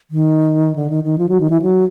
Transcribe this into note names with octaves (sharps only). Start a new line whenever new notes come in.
D#3
D3
D#3
D#3
F3
F#3
D#3
E3
F#3